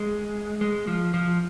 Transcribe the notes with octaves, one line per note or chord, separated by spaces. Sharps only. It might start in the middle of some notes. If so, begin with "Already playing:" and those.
Already playing: G#3
G#3
F3
F3